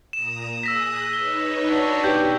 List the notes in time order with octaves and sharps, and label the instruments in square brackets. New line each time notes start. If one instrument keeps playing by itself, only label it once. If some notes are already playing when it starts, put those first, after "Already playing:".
[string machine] A#2 A#5 D#6 [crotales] E7
[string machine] G#4 D#6 F#6 [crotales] E6 A#6 B6
[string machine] D#4 B4 C#5 [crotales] G7
[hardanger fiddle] D4 F#4
[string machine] B2 [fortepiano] G4 [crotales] G6